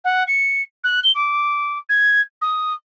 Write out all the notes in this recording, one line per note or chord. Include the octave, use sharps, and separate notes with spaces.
F#5
C#7
F#6
G7
D6
G#6
D#6